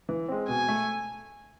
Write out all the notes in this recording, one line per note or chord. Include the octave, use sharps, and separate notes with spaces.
E3
G#3 C4
B2 G#5
A3